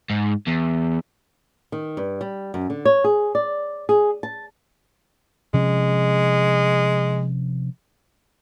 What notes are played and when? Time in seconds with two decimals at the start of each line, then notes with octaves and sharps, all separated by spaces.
0.10 G#2
0.47 E2
1.72 D#3
1.97 G2
2.21 G3
2.54 F#2
2.70 D3
2.85 C#5
3.04 G#4
3.35 D5
3.89 G#4
4.23 A5
5.54 C3 F3 G#3 C#4